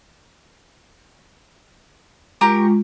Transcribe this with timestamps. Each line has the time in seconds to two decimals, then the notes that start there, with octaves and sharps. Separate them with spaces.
2.41 G#3 F4 G4 A#4 C#6